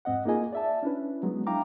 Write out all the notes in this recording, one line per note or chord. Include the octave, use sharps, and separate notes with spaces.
F2 G#2 C4 D#5 F#5
A#3 D#4 F4 G#4 D#5 G#5
D5 E5 A5
C#4 D4 E4 B4
F#3 G#3 B3
D4 E4 F5 G5 A#5 D6